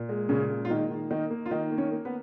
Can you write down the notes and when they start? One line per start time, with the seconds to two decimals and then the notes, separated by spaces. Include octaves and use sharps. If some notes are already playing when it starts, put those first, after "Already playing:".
Already playing: A#2
0.09 G#3
0.29 A#2 C#3 C#4
0.49 G#3
0.65 F4
0.69 D#3 A#3 D#4
0.90 D#3
1.11 D#3 A#3 D#4
1.30 A#3
1.46 F4
1.51 D#3 D#4
1.71 A#3
1.78 C#4 C#5
1.92 A#3
2.05 B3 B4